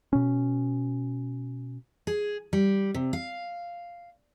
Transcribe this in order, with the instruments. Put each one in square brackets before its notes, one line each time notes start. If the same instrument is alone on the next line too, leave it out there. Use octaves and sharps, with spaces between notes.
[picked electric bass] B2 C#4
[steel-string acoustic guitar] G#4
G3
C3
F5